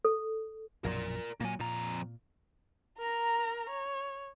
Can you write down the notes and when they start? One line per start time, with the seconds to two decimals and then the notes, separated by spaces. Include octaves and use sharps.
0.05 A4
0.84 A#1 F#2 B2 A#4 D5
1.40 A#2 F#3 A#3 G#5
1.60 F2 A#2 A#5
2.98 A#4 A#5
3.70 C#5